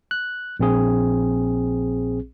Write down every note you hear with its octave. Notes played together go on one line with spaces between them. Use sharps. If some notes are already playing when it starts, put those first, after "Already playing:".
F#6
A#1 C4 G#4